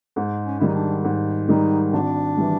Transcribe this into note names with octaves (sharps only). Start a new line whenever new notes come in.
G#2
C#4
D#3 G3 E4
D#4
D4
G#2
D#3 G3 D#4
G#1 D4
E3 G3